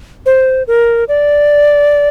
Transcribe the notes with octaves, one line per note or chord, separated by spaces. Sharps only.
C5
A#4
D5